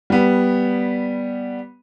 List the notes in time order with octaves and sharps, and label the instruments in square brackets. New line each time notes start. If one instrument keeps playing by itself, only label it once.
[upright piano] G3 B3